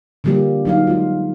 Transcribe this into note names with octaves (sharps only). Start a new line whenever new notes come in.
D3 F3 G3 A#3 G4
F#3 D#4 F5
G#3 F4